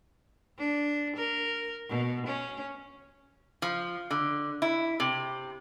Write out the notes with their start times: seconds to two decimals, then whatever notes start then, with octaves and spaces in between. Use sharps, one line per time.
0.58 D4
1.16 A#4
1.90 B2
2.27 C#4
3.62 F3
4.11 D3
4.62 E4
5.00 C3